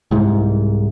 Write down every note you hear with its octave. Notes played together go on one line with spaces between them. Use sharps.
C2 G#2